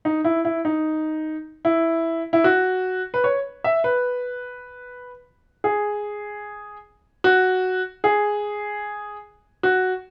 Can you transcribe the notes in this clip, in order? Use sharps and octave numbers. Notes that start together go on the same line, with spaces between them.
D#4
E4
E4
D#4
E4
E4
F#4
B4
C#5
E5
B4
G#4
F#4
G#4
F#4